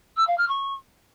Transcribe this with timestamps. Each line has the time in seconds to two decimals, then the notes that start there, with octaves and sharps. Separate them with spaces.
0.16 E6
0.27 F5
0.38 F6
0.48 C#6